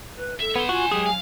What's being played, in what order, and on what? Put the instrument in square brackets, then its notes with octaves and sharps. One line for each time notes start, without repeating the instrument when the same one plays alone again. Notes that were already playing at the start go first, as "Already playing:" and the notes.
[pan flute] B4
[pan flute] A4 [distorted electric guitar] E5
[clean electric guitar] B3 [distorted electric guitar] C#5 C6
[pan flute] F4 [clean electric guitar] F#4 [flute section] G#5
[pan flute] F#3 [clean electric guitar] G#3 G4 G#4
[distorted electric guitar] F5